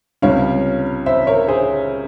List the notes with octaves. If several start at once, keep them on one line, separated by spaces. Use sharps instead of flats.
C#2 C3 G3 C#4 C#5 F5
C5 E5
A#4 C#5
G#4 C5